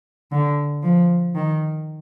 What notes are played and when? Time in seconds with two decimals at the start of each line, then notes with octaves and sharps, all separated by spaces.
0.32 D3
0.83 F3
1.35 D#3